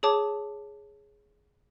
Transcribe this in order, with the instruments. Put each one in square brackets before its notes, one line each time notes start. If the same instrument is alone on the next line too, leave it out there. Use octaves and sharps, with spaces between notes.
[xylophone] G#4 C#5 A5 D6